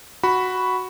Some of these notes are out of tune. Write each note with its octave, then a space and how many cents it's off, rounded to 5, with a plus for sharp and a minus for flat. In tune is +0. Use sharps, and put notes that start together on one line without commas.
F#4 +0 B5 +0